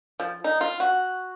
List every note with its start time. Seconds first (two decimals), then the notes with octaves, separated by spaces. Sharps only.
0.20 F3
0.44 D#4
0.61 F4
0.80 F#4